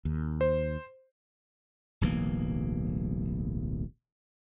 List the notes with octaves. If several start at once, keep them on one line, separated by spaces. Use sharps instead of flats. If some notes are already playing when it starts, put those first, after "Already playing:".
D#2
C5
D1 B1 E3 A#3